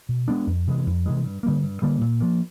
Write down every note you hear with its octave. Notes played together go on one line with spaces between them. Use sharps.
B2
G#3 B3 D4
F2
C3 E3 G#3
F2
C3 E3 G#3
G2
D3 G3 A#3
G2
D3 G3 A#3
A#2
F3 A#3